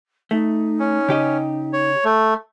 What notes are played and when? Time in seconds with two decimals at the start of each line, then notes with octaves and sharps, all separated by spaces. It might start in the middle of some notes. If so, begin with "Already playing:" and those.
0.31 A3 D#4
0.79 C#4
1.09 C#3 G4 D#5
1.73 C#5
2.05 A3